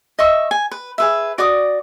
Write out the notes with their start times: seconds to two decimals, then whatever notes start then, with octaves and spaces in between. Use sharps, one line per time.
0.19 D#5 E5 C#6
0.51 G#5
0.71 B4
0.98 G#4 B4 E5
1.38 F#4 D5 D6 D#6